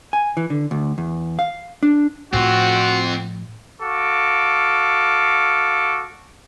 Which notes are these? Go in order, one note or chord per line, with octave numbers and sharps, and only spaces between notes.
G#5
E3
D3
D2
E2
F5
D4
A2 F3 C4 F4 F#4
F#4 A4 F5 D6